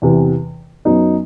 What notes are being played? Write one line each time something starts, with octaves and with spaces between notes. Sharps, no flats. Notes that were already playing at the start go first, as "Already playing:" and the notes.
E2 C3 E3
F#2 F#3 B3 D#4